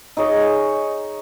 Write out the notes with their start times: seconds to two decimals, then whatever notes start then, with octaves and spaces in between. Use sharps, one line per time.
0.17 D#4 G#4 C#5 D#5